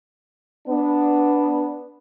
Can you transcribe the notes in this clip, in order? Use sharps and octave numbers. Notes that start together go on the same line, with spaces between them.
B3 D4